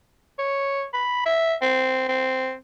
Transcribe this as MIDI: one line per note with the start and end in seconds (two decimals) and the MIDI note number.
0.39 0.84 73
0.94 1.21 83
1.26 1.54 76
1.62 2.05 60
2.09 2.54 60